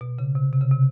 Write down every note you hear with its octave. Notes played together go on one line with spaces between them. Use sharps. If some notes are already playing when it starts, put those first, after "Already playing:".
B2
C#3
C3
C3
C#3
C3